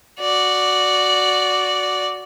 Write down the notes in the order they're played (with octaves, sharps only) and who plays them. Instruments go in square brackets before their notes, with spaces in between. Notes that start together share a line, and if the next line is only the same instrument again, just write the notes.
[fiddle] F#4 D5